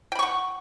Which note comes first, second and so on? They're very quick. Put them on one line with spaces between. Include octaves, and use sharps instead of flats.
G5 B5 C#6 F#5